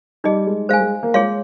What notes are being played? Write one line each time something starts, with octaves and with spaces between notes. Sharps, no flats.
G3 D#4 G#4 D#5
G#3
G#3 C5 F5 G#5
G#3
A#3
G#3 F4 G#4 C#5 F5 C6